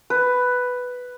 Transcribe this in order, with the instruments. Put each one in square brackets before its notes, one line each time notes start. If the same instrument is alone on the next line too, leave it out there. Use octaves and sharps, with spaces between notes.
[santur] B4